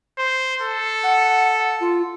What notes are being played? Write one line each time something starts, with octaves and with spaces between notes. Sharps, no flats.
C5
A4
F#5
F4